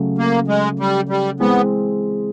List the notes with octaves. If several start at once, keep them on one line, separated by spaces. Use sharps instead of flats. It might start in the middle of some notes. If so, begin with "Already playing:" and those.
Already playing: C#3 F#3 A3
A#3
G#3
G3
G3
E3 G#3 B3 C4